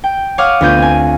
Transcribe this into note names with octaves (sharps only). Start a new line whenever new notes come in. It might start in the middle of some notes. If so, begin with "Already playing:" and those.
G5
C#5 F5 F#5 D6 D#6 F6
D2 B3 F4 G6 D#7
C4 G#5